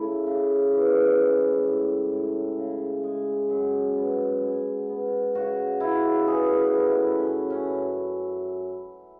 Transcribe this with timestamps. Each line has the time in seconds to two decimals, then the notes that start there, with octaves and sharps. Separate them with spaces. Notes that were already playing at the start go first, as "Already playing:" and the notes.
Already playing: C#3 A3 E4
0.27 C#3
0.72 E3
1.20 G#3
1.65 A2
2.11 A2
2.58 C#3
3.03 G#3
3.50 F#2
3.96 B3
4.42 G#3
4.89 B3
5.35 C#3 F#4
5.80 C#3 E4
6.26 E3 G#4
6.57 B4
6.73 A3
6.88 E4
7.19 F#2 C#4
7.50 C#4
7.65 F#2